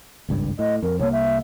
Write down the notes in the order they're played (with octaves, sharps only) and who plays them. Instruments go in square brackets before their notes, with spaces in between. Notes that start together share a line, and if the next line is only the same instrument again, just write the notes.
[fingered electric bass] G#1 C#2 G2
[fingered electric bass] A2 [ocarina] D#5
[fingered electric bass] F2 [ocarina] A#4
[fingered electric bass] C2 A#3 [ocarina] C#5
[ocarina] E5